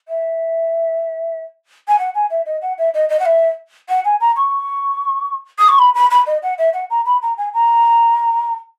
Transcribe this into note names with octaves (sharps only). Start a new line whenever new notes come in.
E5
G#5
F#5
G#5
E5
D#5
F#5
E5
D#5
D#5
F#5
E5
F#5
G#5
A#5
C#6
D#6
C#6
B5
B5
B5
D#5
F#5
E5
F#5
A#5
B5
A#5
G#5
A#5